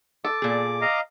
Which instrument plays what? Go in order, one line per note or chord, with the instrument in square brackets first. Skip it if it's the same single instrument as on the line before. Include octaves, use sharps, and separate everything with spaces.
[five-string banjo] A4 [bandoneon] D6
[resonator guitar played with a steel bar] A#2 G#4
[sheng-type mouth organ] D#5 F5 A#5